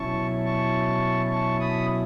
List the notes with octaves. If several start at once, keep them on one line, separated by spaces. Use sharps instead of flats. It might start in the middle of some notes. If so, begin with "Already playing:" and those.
Already playing: B2 F#3 C#4 E4 A5 C#6
A5 C#6
A5 C#6
B5 D#6